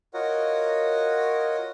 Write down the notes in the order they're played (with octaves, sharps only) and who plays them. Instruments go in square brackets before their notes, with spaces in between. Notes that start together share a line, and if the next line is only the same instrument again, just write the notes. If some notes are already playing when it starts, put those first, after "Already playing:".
[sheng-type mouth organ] F4 F#4 A#4 C#5 D#5 F#5